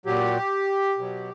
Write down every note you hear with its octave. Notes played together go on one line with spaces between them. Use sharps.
A#2 F#3 G4
B2 F#3